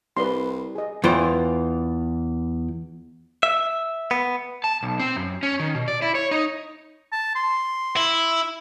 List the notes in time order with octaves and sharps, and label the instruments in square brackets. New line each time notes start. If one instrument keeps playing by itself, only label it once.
[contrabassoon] C2 [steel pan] B4 D5 C6
[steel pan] G#4 D#5
[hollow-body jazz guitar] E2 E3 F4 C5 G5
[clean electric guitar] E5
B3
[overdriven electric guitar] A5
B1
C4
F#2
C#4
D#3
B2
D5
E4
C#5
D#4
[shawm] A5
C6
[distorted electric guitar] E4